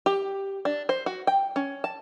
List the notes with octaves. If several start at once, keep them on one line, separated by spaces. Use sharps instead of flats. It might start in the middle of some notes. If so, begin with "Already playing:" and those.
G4
D4
C5
F#4
G5
C#4
A5